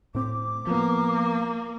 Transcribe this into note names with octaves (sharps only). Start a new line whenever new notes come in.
A2 C4 D6
F3 A#3 B3